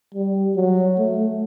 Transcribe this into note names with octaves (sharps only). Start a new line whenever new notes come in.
G3
F#3
A3